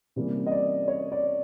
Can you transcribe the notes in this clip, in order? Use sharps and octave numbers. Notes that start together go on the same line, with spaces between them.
C3 E3 G3 A#3 C#4
D#5
D5
C#5
D5